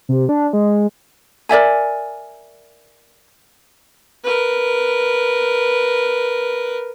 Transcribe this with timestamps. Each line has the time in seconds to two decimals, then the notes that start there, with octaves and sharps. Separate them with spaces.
0.09 C3
0.29 D4
0.53 G#3
1.49 A#4 D5 E5 G#5
4.24 A#4 B4